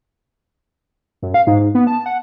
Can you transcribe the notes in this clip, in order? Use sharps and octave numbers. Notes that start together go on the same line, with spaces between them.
F#2
F5
G#2
G#2
B3
A5
F#5